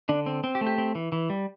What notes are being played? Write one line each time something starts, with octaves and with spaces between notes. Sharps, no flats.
D3 D4
C4
C4
G4
A3
G4
C4
E3
E3
G3